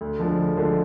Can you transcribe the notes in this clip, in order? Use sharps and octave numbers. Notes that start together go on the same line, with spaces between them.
D2
D3 F3 G#3
D2
D3 F3 G#3